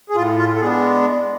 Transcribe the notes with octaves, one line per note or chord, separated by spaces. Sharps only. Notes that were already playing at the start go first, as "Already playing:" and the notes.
G#4
A2 F4
F4
A4
G#3 B3 D4 G#4